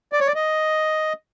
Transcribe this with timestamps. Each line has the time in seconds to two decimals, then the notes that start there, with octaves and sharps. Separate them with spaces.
0.13 D5
0.20 C#5
0.27 D5
0.35 D#5